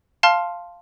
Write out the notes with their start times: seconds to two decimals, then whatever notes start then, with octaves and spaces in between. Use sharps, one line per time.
0.23 F5 A5 C6 F6